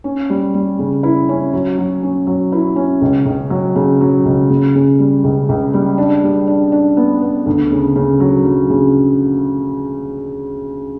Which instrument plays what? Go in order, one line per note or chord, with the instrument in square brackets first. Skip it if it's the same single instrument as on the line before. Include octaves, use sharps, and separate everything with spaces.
[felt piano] C#4
G3
G3
C#3
E4
C#4
F#3
F#3
C#4
F#3
E4
C#4
C#2
C#2
F#3
C#3
F#3
C#2
C#3
C#3
G3
C#2
C#2
G3
D4
G3
D4
D4
B3
B3
D2
C#3
C#3
F#3
F#3
C#3